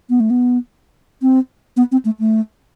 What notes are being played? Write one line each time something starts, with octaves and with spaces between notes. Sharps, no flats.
B3
A3
B3
C4
B3
C4
A3
A3